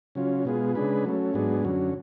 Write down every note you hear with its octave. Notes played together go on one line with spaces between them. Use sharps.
C#3 F#3 C#4 F4
B2 G#3 B3 F4 G#4
C#3 G#3 D4 G#4 B4
F#3 A3 C#4
G#2 F#3 B3 D4 G#4
F#2 D3 F#3 C#4